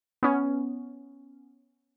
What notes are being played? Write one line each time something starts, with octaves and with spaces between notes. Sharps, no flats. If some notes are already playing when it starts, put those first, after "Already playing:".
B3 C#4